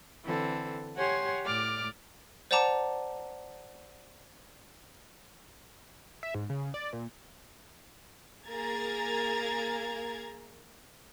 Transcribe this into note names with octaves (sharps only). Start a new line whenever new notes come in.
D3 E3 C4 A4
G4 C#5 F#5 G#5 C6
A2 D5 D6 F6
C5 D5 F#5 A5 A#5 D6
E5
G#2
C#3
D5
A#2
A#3 G#4 A#4 A#5 G#6 A6